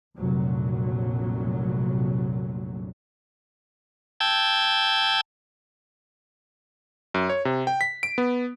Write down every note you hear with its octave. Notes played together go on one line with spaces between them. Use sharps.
F1 A#1 A#2 F#3
G5 A5 E6 G6 G#6
F#2
C#5
C3
G5
B6
D7
B3